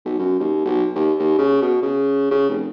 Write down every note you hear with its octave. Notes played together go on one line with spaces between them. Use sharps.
B1
F#2
D#2
B1
D#2
D#2
C#3
B2
C#3
C#3
F1